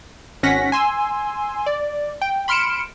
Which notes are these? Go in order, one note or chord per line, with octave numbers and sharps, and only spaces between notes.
G#1 C#4 F#5 A#6 B6
G#5 C6 E6
D5
G5
B5 C6 F6 C#7 D7 E7